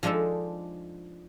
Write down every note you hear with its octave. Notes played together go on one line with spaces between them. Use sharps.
F3 G#3 D4 D#4 A4